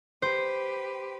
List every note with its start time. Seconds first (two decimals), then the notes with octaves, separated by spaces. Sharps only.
0.22 G4 B4 C5